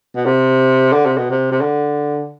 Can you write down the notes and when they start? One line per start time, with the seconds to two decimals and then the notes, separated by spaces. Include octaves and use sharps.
0.15 B2
0.25 C3
0.93 D3
1.06 C3
1.17 B2
1.30 C3
1.52 C3
1.61 D3